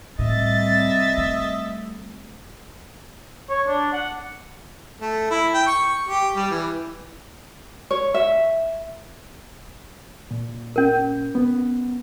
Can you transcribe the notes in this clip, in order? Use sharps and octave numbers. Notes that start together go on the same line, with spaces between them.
C2 A2 D#5 E5 A6
A3
C#5
D4
F#5
A3
E4
G5
C#6
G4
G3
E3
C#5
E5
A#2
C#4 A#4
B3